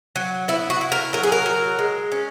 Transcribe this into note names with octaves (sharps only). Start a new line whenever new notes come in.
F#3
B3 E4
F#4
E4
A#4
F#3 A#4
G#4
A#4
F#3
G#3
C#4